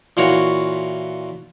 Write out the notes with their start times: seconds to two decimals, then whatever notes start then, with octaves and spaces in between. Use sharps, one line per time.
0.17 A#2 E3 F4 F#4 C#5